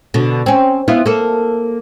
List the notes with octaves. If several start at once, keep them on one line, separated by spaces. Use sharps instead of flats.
B2 D3
C4 C#4
B3 E4 F4
A#3 A4